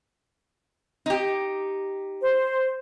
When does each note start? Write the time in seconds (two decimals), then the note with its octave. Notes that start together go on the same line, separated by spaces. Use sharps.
1.06 D#4 G4
2.22 C5